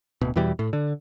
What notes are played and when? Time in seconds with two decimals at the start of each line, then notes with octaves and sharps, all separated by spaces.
0.21 D1 B2
0.36 E2 B2 E3 G3
0.59 A2
0.73 D3